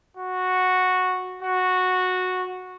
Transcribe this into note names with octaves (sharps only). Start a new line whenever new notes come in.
F#4
F#4